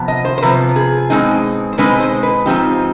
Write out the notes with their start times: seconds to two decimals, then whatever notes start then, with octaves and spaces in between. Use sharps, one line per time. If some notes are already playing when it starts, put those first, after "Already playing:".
Already playing: C3 F3 B3
0.08 D#5
0.25 C5
0.38 C5
0.42 C3 F3 B3 B4
0.76 G#4
1.10 B2 G#3 C4 D#4
1.73 C5
1.78 B2 G#3 C4 D#4 B4
2.00 C5
2.23 B4
2.46 G#2 F3 C4 D#4 G4